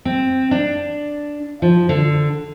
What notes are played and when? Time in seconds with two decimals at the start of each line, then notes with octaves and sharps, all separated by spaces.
0.05 C4
0.51 D4
1.62 F3
1.89 D3